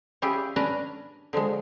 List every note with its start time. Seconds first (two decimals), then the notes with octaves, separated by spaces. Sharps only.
0.22 C#4 E4 F4 G4 G#4
0.56 C#4 D4 B4 D5 G#5 A#5
1.33 D3 F3 F#3 G#3